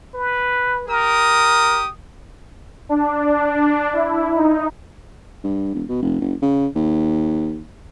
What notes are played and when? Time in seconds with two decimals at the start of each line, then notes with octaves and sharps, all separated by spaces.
0.14 B4
0.88 G4 A#4 D#6
2.89 D4
3.93 E4
4.36 D#4
5.44 G2
5.74 E1
5.89 B2
6.02 F1
6.20 F#1
6.42 C#3
6.75 D#2